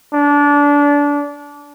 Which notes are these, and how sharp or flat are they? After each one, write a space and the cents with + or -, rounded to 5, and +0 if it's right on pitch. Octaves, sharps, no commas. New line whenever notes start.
D4 -25